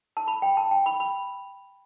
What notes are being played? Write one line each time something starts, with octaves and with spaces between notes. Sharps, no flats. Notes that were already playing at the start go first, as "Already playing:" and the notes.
A5
B5
G5
A5
G5
B5
B5